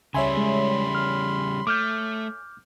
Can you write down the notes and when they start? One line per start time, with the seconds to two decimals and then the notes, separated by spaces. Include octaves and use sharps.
0.14 C#2 C#3 G3 C#5 E5 G#5 B5 C6
0.37 G#3
0.95 F6
1.67 A3 D6 F6 G6